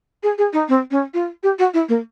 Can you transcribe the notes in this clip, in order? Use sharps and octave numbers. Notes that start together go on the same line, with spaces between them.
G#4
G#4
D#4
C4
C#4
F4
G4
F#4
E4
A#3